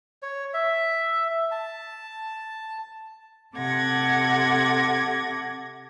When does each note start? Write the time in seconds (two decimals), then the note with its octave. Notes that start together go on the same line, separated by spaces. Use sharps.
0.22 C#5
0.54 E5
1.51 A5
3.54 C3 A4 F#5 D6 G#6 A#6